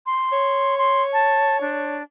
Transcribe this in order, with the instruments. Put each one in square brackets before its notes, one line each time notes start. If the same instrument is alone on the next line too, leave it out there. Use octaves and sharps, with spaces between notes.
[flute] C6
[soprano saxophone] C#5
[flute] C6
A5
D4